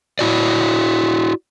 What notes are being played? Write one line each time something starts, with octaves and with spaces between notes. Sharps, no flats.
E4 F#4 D5